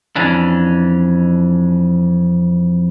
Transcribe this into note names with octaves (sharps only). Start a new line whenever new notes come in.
F2 E3 C#4 D4